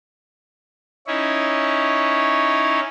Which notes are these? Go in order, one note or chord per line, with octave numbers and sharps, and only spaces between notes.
C#4 D#4 E4 C#5